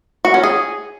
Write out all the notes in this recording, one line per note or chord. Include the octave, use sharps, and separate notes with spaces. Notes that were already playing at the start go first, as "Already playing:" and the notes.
F#4
C#4
G#4